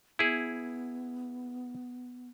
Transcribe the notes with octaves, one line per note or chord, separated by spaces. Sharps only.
B3 E4 G#4